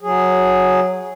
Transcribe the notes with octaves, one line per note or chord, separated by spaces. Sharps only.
F#3 G#4